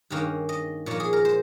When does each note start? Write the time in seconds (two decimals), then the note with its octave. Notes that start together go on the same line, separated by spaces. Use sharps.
0.10 G2 D#3 A#3 C#4
0.49 D#5
0.86 A#2 F3 A#3 C#5
1.00 G#4
1.13 A#4
1.25 C5